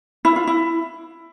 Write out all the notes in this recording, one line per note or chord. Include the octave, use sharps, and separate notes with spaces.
E4
F4
E4